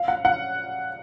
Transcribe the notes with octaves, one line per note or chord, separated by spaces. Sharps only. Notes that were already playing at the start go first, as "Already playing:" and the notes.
Already playing: F5
F#5
F#5